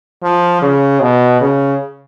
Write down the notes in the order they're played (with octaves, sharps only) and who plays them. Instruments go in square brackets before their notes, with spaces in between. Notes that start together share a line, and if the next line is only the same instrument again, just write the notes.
[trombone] F3
C#3
B2
C#3